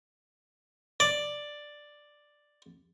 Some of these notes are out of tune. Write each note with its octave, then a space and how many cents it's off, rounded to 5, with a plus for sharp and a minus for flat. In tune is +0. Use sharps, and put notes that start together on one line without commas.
D5 +5